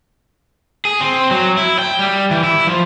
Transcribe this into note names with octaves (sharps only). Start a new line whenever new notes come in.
G#4
C4
F#3
E4
G5
G3
E3
E4
F3